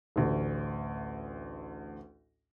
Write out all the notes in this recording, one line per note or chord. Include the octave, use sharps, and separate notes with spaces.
A1 D2